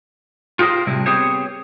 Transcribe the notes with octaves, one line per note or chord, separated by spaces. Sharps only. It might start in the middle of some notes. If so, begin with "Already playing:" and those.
F4 G4 G#4 A#4 C5
A2 C3 G3 E4
B3 C4 G4 G#4 C5 C#5